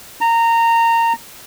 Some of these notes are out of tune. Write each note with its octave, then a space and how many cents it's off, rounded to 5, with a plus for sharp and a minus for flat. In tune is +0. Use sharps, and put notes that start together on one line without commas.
A#5 -20